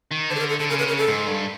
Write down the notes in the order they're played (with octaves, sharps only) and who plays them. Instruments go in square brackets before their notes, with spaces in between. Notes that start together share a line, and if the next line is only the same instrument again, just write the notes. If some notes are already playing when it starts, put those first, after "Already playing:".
[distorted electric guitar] D#3
[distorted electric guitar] D3 [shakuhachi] C5
[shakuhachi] A4
A#4
A4
[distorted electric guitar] D3 [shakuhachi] A4
[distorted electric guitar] C#3 [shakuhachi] A#4
[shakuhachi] B4
A#4
A4
[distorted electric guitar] G#2
G2